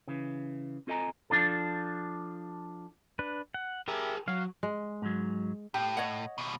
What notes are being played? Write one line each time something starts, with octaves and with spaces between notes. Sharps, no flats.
C#3 E3
C4 F4 A4 D#5 G#5 A#5
F3 D4 F4 A4
D4 B4
F#5
G4 G#4 A#4 E5
F#3 F5
G#3
G#2 F#3
A2 G4
C#5 D#5 F#5
D#2 B2